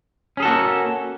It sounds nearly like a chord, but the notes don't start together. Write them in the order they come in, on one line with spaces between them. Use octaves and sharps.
C#4 G#4 A4 F#4 A#3